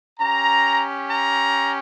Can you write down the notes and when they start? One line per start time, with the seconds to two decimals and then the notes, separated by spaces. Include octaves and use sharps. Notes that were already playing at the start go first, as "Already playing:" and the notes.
0.19 C#4 G4 A#5
1.10 A#5